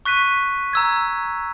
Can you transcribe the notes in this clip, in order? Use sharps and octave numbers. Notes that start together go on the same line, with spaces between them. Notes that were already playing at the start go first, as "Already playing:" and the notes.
C#6 F#6 B6 D#7
A#5 E6 G#6